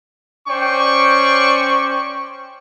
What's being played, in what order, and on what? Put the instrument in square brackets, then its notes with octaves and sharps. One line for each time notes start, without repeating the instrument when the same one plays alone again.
[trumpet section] C#4 C5 D5 G5 C#6